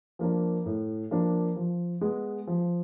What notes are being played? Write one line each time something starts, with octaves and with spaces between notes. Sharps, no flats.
F3 A#3 D4
A2
F3 A#3 D4
F3
G#3 B3
F3